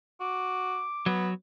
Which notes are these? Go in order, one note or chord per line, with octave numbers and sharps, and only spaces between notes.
F#4 D6
F#3 B3